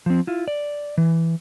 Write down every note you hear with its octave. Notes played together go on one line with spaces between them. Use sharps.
F3 C4
E4 F4
D5
E3